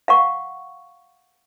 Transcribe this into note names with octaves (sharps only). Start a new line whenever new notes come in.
F5 F#5 C#6